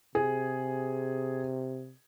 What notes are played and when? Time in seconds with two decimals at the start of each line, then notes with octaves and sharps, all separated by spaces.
0.15 C3 G#4